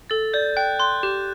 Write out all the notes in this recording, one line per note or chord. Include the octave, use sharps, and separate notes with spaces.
A4 A6
D5 G6
G5 F#6
C6 F#6
G4 G6